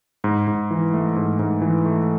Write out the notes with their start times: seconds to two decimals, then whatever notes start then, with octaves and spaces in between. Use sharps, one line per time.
0.24 G#2
0.48 G#2
0.71 E3
0.94 A3
1.16 G#2
1.39 G#2
1.62 E3
1.85 A3